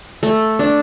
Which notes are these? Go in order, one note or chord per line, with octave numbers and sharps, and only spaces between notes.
A3
D4